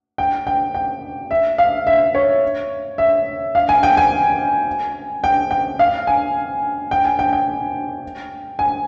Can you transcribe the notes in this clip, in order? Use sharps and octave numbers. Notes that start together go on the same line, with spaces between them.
G5
G5
G5
E5
F5
E5
C#5
E5
F5
G#5
G5
G#5
G5
G5
F5
G#5
G5
G#5
G5
G5
G#5